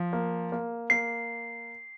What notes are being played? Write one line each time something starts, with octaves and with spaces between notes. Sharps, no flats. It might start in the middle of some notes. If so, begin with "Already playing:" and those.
Already playing: F3
A#3
A#3
A#3 C7